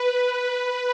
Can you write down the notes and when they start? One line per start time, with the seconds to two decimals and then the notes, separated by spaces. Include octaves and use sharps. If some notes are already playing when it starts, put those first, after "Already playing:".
Already playing: B4
0.38 B4